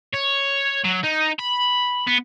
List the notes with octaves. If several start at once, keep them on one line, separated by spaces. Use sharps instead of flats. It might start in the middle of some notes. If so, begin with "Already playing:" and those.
C#5
F#3
D#4
B5
B3